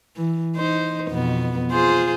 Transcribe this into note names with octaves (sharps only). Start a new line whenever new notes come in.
E3
D#4 C5
F2 B2 B3
F4 G#4 C5